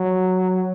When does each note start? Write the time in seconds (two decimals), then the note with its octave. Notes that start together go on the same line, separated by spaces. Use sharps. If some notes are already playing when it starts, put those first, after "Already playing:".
Already playing: F#3